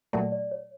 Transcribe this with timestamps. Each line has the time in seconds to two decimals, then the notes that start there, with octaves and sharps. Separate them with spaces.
0.13 A#2 F#3 A3 D5
0.32 D5
0.51 C#5